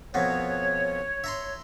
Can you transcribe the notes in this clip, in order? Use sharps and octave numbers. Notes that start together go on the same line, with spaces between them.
F2 B2 B3 C#5
E5 A#5 C6